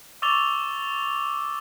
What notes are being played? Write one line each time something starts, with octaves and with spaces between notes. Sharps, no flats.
C#6 D6 E6 A6 F7 G7